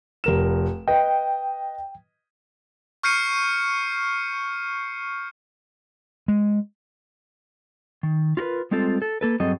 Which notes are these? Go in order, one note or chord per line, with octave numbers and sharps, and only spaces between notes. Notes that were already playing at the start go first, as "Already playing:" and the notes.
F1 A#4 E7
B4 D#5 G5
C#6 F6 G6 C7 C#7 D#7
G#3
D#3
F4 F#4 A#4 B4
G3 G#3 C4 F4 A4
A4
A#3 A4 B4
G2 F#3 C4 G#4 A4 D#5